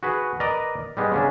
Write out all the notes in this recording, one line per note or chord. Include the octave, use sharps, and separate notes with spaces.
F#4 G#4 B4
A#4 B4 D5 D#5
G3 G#3 B3
C#3 C#4 D4